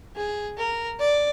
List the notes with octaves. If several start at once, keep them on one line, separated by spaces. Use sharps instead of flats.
G#4
A#4
D5